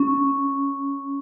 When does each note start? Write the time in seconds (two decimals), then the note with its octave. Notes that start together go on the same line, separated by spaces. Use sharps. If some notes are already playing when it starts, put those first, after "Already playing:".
Already playing: C#4